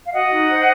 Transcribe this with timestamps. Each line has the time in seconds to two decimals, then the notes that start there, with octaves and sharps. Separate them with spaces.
0.05 F5
0.12 F#4 D#5 F#5
0.31 D#4
0.49 C5